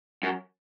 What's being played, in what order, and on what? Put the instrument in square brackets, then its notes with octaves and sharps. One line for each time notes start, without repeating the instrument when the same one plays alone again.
[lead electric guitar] F#2